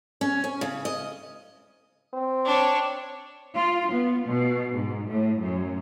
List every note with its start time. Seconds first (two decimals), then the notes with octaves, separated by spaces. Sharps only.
0.21 C#4
0.44 C#4
0.61 C#3
0.85 D#5
2.13 C4
2.45 D4 C#5
3.54 F4
3.91 B3
4.27 B2
4.74 G#2
5.08 A2
5.39 F#2